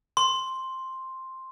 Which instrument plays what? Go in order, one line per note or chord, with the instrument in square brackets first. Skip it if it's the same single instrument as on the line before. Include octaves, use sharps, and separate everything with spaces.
[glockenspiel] C6